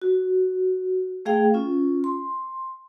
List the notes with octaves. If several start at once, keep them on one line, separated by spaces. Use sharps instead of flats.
F#4
A3 G#4 F5 G5
C#4 F4
C6